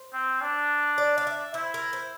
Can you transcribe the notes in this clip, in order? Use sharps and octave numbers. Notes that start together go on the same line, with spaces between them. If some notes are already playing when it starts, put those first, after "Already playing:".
Already playing: C5
C4
D4
D5
F5
E5
E4 C5
A#4
C5